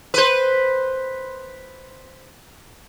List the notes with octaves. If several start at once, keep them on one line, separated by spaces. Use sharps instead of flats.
B4 C5